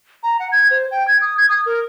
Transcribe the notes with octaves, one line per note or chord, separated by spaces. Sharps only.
A#5
F#5
G#6
C5
G5
G#6
D#6
G#6
D#6
A#4